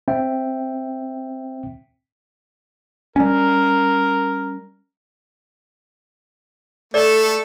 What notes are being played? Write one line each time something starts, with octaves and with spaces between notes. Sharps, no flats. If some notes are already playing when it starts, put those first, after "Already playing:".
C4 E5 G5
G3 C#4 A#4
A3 A4 D5